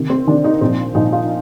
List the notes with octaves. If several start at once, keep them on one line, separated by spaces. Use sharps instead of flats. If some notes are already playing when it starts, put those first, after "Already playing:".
Already playing: C3 D#3
C4
C3 D#3 D4
D#4
A#2 F3 C4
A#2 F3 D#4
F4